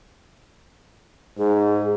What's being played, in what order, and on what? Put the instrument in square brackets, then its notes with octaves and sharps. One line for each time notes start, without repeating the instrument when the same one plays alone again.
[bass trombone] G#2 [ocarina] G#4